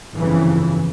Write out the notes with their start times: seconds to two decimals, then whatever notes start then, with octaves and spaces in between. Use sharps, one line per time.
0.15 G1 F2 C#3 E3